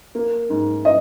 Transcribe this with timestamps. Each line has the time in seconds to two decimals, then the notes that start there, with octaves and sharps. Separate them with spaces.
0.15 A#3
0.50 G#2
0.85 D#5